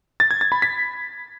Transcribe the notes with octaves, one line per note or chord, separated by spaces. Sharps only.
A6
G#6
A6
B5
B6